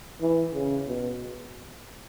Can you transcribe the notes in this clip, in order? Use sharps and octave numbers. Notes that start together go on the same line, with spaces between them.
E3
C#3
B2